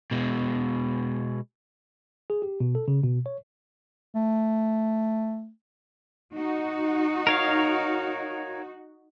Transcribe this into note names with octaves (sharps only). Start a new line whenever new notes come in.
B2 G#3
G#4
G4
B2
A4
C#3
B2
C#5
A3
D#4 F#4
A#4 C#5 F5